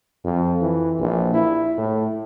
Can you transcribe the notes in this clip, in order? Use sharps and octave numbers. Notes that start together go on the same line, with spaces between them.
F2
E3
A#1
E4
A2